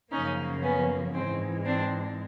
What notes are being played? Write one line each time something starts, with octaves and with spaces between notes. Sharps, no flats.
F#2 C#3 F3 A#3 C#4 D#4
B3 C#4
G#2 E3 G#3 C4
C4 D4